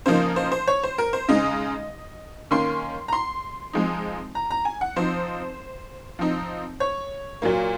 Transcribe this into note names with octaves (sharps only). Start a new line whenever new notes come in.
C#3 F3 A#3 D#4 C5
C5
C5
C#5
C5
A#4
C5
C#3 G#3 D#4 D#5
D#3 A#3 C#4 C6
A#5
C6
F3 G#3 C4 D#4
A#5
A#5
G#5
F#5
F3 C4 D#4 C5
F3 C4 D#4
C#5
A#2 F#3 A#3